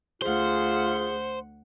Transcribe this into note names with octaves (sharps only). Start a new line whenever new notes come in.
D2 F4 G#4 C5 F#5